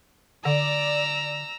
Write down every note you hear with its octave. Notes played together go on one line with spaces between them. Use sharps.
D3 D5 A#5 E6